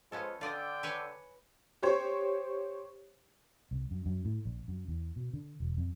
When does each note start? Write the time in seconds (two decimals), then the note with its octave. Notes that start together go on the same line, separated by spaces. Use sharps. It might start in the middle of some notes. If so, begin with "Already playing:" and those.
0.12 F3 G#3 B3 C#4 F4 A4
0.41 D3 F4 D5 D#5 G5
0.83 B4 C#5 G#5
1.82 G4 C5 C#5
3.71 C2
3.91 F#2
4.06 F#2
4.25 A2
4.45 A#1
4.68 F#2
4.88 E2
5.16 B2
5.33 D3
5.60 E1
5.77 F2